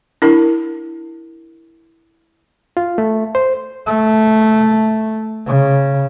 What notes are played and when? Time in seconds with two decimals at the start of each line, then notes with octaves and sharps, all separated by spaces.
0.22 D4 E4 A#4
2.77 F4
2.98 A3
3.35 C5
3.87 A3
5.46 C#3